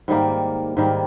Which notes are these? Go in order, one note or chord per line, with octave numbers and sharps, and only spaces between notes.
G#2 D#3 G3 A#3
G#2 D#3 G3 A#3